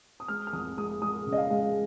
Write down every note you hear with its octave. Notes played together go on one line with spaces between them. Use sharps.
D#6
G#3 F6
F6
F1 D#6
G#3 D#6
G#3 D#6
C#3
D#5
F5
G#3